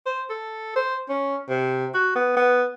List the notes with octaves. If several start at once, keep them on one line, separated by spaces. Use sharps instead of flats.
C5
A4
C5
C#4
C3
F#4
B3
B3